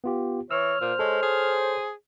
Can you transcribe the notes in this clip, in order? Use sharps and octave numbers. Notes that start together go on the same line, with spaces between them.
B3 F4 G4
E3 C#5 E6 F6
A#2 C5
G#3 A4 C#5
G#4